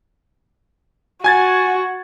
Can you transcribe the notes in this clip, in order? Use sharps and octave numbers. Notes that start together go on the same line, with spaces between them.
F#4 G#5 G#6 A6